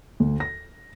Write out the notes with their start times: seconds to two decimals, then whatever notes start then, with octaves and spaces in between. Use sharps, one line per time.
0.20 D2
0.40 A#6